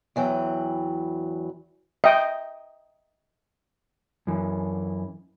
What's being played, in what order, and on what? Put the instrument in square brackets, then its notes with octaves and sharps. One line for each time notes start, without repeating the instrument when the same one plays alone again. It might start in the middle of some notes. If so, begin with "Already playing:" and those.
[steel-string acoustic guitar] E2 E3 F#3 G5
[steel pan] D#5 G5 [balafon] E5
[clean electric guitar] F#2 E3